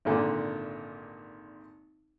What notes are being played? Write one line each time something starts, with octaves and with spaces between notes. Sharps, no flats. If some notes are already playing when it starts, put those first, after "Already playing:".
G#1 A#2 D3